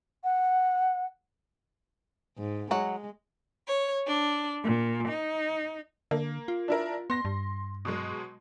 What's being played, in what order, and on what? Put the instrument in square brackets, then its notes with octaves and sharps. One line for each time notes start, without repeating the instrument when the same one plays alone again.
[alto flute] F#5
[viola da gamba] G#2
[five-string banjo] F#3 F#5 [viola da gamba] G#3
[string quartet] C#5
D4
A#2
D#4
[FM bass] D3 [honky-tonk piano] A#3
[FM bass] F4
[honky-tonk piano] D4 E4 A#4
[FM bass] B3 [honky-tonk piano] C6 A#6
[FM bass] G2
[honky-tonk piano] B2 F#3 G#3